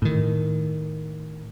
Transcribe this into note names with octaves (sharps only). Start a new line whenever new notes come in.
A2 D#3